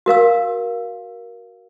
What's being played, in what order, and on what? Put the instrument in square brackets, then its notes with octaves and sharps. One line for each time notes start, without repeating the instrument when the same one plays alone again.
[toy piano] F#4 A#4 F5 E6